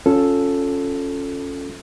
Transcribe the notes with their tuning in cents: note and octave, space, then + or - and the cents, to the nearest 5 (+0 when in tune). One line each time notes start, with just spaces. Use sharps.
C#4 +0 F4 +20 A4 +0